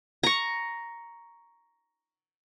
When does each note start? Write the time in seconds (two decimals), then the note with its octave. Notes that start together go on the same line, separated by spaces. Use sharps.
0.23 A#5 C#6